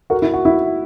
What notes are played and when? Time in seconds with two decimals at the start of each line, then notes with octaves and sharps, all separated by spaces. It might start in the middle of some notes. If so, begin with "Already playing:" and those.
0.10 F#4 A#4
0.22 E4
0.33 F#4
0.45 E4